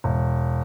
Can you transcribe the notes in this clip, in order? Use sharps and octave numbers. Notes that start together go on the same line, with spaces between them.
E1